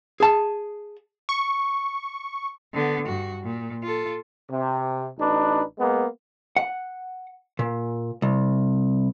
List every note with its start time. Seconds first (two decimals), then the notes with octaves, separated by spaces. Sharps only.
0.20 G#4 A5
1.29 C#6
2.74 D3 B3
3.08 G2 F#4
3.43 A#2
3.83 F4 A4
4.50 C3
5.19 A1 D4 D#4 B4
5.78 G#3 A#3 B3
6.56 F#5
7.59 A#2
8.22 C2